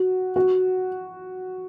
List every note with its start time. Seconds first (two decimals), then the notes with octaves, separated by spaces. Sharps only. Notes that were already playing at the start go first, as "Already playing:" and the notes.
Already playing: F#4
0.36 F#4